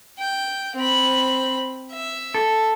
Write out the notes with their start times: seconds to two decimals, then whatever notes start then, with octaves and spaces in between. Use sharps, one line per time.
0.19 G5
0.76 C4 B5
1.92 E5
2.34 A4